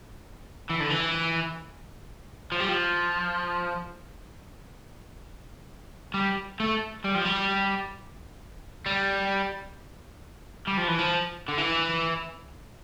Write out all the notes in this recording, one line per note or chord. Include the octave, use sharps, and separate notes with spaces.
E3
D3
E3
F3
G3
F3
G3
A3
G3
F3
G3
G3
G3
F3
E3
F3
D3
E3